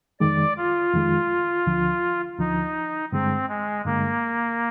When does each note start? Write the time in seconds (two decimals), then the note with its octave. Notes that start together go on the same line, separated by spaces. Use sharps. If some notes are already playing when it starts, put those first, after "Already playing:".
0.20 F2 D#3 G#3 D5
0.57 F4
0.93 F2 D#3 G#3
1.67 D2 D3 F3
2.39 D2 D3 F3 D#4
3.12 G2 D3 G#3 C4
3.49 G#3
3.85 G2 D3 G#3 A#3